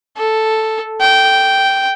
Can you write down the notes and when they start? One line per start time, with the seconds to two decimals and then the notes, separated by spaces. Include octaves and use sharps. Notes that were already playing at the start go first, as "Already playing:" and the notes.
0.17 A4
1.01 G5